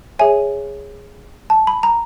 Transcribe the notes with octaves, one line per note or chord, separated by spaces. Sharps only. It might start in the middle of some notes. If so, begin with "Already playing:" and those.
G#4 C#5 E5 G#5
A5
B5
A#5